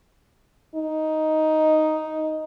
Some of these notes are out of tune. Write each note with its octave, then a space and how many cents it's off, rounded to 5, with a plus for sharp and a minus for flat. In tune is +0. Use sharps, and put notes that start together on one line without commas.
D#4 +5